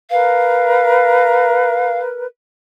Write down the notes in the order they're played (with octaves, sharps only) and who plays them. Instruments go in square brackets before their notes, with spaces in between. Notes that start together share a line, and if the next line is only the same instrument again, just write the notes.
[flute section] A#4 B4 [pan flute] F5